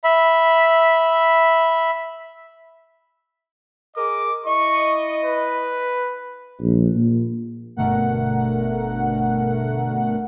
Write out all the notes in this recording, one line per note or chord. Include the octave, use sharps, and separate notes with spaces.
E5 B5
G#4 A#4 D#5 D6
E4 D#5 C#6
B4
A#1
A#2
G1 B2 D3 A3 A#4 F#5